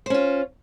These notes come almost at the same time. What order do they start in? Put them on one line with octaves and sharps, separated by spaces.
C5 C#4 F4